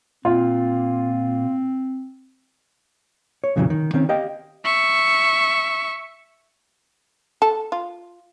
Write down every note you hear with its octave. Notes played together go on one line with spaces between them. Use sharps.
A#2 C4 F4
C#5
F2 A#2 C#3 E3 F#3
D#3
D#3 C4 C#4
G4 D#5 F5 G5
E5 C#6
A4
F4